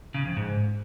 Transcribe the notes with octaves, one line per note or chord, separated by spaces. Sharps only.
C#3
F2
G#2